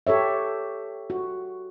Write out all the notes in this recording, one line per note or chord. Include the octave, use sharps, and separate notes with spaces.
G4 A4 C#5 E5
F#4